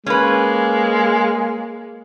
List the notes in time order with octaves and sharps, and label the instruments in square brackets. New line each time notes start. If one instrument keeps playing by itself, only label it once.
[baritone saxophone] G#3 [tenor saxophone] A#3 [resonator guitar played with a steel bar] C#4 B4